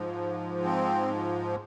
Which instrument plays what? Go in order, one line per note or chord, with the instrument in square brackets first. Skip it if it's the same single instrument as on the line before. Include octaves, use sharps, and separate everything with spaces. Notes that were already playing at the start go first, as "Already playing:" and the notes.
Already playing: [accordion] G#2 F3
C4